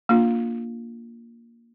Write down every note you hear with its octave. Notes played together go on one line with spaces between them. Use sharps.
A#3 D4 F4